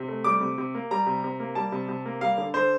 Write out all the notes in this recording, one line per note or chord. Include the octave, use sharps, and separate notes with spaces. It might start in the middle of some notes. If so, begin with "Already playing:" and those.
Already playing: C3
A3
G3 D6
C3
C3
A#3
G3 A#5
C3
C3
A#3
G3 A5
C3
C3
A#3
G3 F5
D3
D3 C5